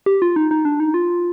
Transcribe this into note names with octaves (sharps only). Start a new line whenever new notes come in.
G4
F4
D#4
D#4
D4
D#4
F4